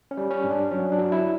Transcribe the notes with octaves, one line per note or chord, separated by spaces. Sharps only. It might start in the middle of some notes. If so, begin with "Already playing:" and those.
C#4
G3
C#4
G2
D4
F#3 C#4
D4
F#3
E4